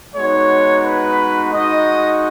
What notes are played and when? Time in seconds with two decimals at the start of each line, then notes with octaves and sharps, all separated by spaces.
0.15 G#3 B3 D#4 F#4 C#5
0.83 B4
1.52 G#3 D#4 F#4 D#5